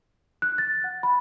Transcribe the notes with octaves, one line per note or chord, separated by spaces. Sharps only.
F#6
A6
F#5
B5